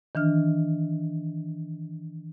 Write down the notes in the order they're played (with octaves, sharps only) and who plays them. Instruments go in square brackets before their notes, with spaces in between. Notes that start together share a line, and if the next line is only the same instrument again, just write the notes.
[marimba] D#3 E3 D4 F6